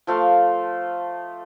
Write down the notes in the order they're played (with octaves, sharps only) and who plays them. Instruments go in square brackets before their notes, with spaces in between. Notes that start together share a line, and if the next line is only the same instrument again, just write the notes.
[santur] F3 A3 F5